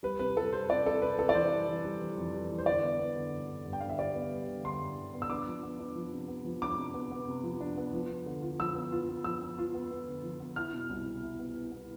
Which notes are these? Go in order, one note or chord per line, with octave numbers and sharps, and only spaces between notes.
G3 B4
C3 B4
G3 A4
G3 C5
C3 D5
C3 A4
C3 B4
C3 A4
D5
E3 C5
G3
E3
G3
E3
F2
G3
E3
C5
D3 D5
B3
B3
D3
G2
D3
G2
G5
D3 F5
E5
G3 D5
B3
G3
D3
D3 C6
G2
D3
B3
E6
D4 D6
F3
B3
D4
F3
C3
B3
F3
D4 D6
C3
B3
B3
C3
F3
D4
B3
F3
B3
D3
F4
F3 E6
B3
F4
B3
F3 E6
B3
F4
B3
B3
D3
F3
B3
E4 F6
B2
C2
B2
E4
B3
E4
B3